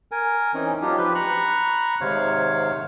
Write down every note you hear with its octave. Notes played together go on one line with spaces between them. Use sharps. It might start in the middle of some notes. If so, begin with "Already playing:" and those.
A#4 G#5
E3 C4 C#4 D#4
F#3 D4 D#4 F4 G4
F3 G4 B4 C5 G6
A#5 B5 C#6 F#6
G#2 C3 D#3 C5 C#5 F5